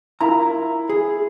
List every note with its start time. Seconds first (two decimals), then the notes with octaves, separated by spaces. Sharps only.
0.21 E4 F4 A#4 A#5
0.89 G#4